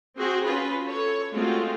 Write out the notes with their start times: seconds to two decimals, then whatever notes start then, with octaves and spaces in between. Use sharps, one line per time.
0.15 C4 F#4 G#4
0.45 C#4 F4 B4
0.86 A4 C#5
1.32 G#3 A3 C4 F4 F#4